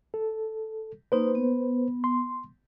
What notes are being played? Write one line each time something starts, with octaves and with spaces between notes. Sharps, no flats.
A4
A#3 D#4 B4 C5
B3
C6